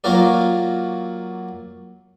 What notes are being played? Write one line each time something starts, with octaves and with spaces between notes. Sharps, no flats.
F#3 A#3 F4 F#4 A#4 D5